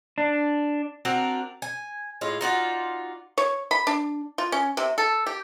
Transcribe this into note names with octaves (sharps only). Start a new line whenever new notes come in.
D4
C4 D4 F#4 A#4
G#5
A2 G#3 F4
D#4 F4 F#4 D5
C#5
B5
D4
F4
C#4
C3
A4
G4